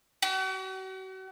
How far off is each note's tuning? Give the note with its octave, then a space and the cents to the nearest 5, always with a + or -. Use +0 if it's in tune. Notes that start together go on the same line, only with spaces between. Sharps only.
F#4 +40